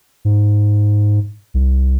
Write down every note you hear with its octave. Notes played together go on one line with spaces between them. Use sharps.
G#2
C2